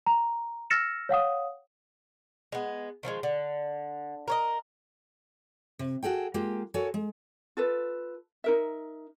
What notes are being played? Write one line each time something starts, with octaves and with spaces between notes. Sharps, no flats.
A#5
E6 F6 A6 A#6 C#7 E7
C#5 F5 F#5 D#6
G#3 B3
D#3 F3 F#3 G#3
D3
A#4 C#5 D#5
C3
F#4 G#4 A4 G5
G#3 A#3 F4 G4
F#4 A4 A#4 C#5 G#5
G#3
F4 A4 B4
D#4 A#4 E5